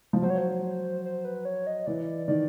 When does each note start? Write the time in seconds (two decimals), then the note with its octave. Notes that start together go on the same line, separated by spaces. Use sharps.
0.13 F3
0.22 F#3 C5
0.30 C#5
0.38 C5
1.05 C5
1.25 B4
1.45 C#5
1.67 D#5
1.86 E3 D5
2.27 D#3 D5